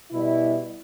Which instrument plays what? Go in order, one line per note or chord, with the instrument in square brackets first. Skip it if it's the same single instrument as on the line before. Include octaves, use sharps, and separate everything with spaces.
[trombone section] B2 G3 E4